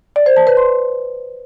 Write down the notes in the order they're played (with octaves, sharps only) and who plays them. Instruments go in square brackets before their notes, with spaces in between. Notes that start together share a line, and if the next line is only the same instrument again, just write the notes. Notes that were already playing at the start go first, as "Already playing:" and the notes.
[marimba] D5
C5
A5
B4
C6